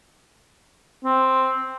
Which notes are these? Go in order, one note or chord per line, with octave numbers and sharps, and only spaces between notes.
C4